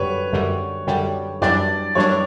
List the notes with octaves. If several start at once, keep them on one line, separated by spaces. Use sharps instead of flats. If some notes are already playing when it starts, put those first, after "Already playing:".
Already playing: F#2 D3 G3 B4 C#5
F#2 D3 G3
F#2 D3 G3
F#2 E3 G3 D4 D5
F#2 E3 G3 D4 C#5